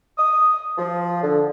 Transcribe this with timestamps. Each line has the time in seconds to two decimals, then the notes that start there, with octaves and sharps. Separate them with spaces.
0.18 D#6
0.78 F3
1.23 D3